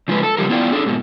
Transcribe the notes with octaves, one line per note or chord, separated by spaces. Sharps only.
C#3 F3 G#3 B4
A4
C#3 F3 G3 A#4
B3 E4 F4 D5 G5
D4 G#4 A4
G#2 B2